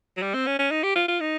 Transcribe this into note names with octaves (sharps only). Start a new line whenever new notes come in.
F#3
G3
C4
C#4
C#4
D#4
G4
F4
F4
D#4